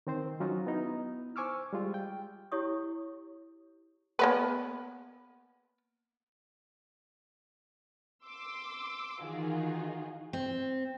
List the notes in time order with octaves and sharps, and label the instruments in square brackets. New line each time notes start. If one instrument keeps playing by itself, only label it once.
[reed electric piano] D#3 C4 C5
F#3 C#4 D#4 F4 F#4
B3 D#4 E4
C5 G#5 C#6 D6 E6 F6
G3 G#3 F4
G5
[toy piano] E4 G4 G#4 C#5 C#6 D#6
[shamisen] A#3 B3 B4
[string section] C6 D6 E6
D#3 E3 D#4 F4 F#4 G#4
[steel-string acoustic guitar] C4